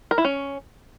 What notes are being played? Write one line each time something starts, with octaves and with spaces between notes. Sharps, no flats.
A#4
E4
C#4